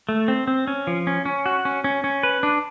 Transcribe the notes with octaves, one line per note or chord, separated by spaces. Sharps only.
A3
C4
C4
C#4
F3
C#4
C#4
F#4
C#4
C#4
C#4
B4
D4